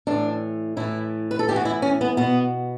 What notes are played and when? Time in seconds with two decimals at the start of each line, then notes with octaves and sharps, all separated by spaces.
0.07 A2 E3 D4
0.77 A2 E3 E4
1.31 B4
1.39 A4
1.48 A2 E3 G4
1.56 F#4
1.65 E4
1.82 C#4
2.01 B3
2.17 B2 B3